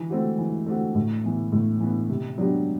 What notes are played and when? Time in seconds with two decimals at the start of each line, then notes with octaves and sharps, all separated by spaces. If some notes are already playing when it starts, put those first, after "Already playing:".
Already playing: E3
0.10 A3 C4 F#4
0.38 E3
0.66 A3 C4 F#4
0.95 A2
1.24 E3 B3
1.52 A2
1.80 E3 B3
2.09 C3
2.38 F#3 B3 D4 G4